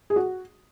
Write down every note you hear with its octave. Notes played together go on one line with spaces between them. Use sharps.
G#4
F#4